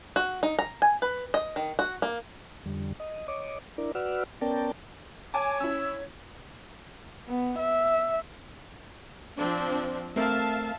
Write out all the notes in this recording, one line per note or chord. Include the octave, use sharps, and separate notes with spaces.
F#4
D#4
A#5
G#5
B4
D#5
D#3
F#4
A#3
F2 D3 G3
D#5
C#5 D#5 D6
D4 E4 A#4 D5
F#4 B4 D5 F#5 E6 F6
B3 C#4 A#4 D5 G5 A5
C#5 G#5 A5 D6
C#4 E4 E6
B3
E5
F3 C4 D4
A3 C4 A#4 E5 F5 A5